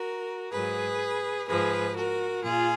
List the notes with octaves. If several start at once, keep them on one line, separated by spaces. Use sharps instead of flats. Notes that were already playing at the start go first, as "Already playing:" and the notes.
Already playing: F#4 A#4
G#2 F#3 G#4 B4
G#2 F3 G#4 B4
F#4 A#4
A#2 F4 G#4